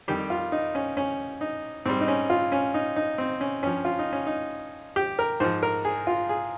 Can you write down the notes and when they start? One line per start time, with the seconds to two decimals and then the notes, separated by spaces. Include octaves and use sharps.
0.08 F2 D#3 G3 G4
0.30 F4
0.52 D#4
0.75 C#4
0.97 C#4
1.41 D#4
1.85 G#2 G3 C4
2.01 D#4
2.08 C#4
2.30 F4
2.52 C#4
2.74 D#4
2.96 D#4
3.18 C4
3.41 C#4
3.63 G2 F3 C#4
3.85 F4
3.99 D#4
4.13 C#4
4.27 D#4
4.96 G4
5.19 A#4
5.40 G#2 F3 C5
5.63 A#4
5.85 G#4
6.07 F4
6.29 G#4